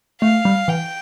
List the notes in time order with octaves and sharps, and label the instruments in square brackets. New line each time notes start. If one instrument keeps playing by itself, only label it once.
[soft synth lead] A3 [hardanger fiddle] F5
[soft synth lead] G3
[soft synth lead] E3 [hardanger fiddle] G5